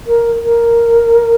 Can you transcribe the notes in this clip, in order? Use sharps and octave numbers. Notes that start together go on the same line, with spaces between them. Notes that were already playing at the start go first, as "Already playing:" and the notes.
A#4
A#4